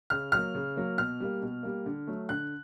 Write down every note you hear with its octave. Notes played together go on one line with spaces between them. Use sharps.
C#3 F6
F#3 A#3 F6
C#3
F#3 A#3
B2 F6
G3 A#3
B2
G3 A#3
D3
F#3 A3
D3 F#6